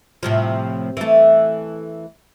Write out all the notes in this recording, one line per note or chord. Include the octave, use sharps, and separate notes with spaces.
A2 C3 F3
E3 A3